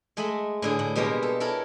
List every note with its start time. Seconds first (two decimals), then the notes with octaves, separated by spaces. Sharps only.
0.17 G#3 A3 D#5 E5 B5
0.62 A2 D3 G#4
0.79 A2
0.96 B2 G3 G#3 A#3 G4 A#4
1.23 A4
1.40 E4 A4 A#4 C#5